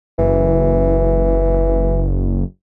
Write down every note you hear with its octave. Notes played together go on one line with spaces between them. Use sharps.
F#1 E3